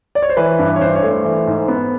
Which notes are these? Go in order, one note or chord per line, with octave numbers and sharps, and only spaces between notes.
D5
C#5
C5
E3 B4
G2
C#5
G2 C5
C#5
A3
C5
E3
G#2
B3